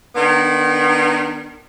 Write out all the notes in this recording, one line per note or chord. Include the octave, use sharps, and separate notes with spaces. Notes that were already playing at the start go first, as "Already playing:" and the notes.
D#3 B3 D4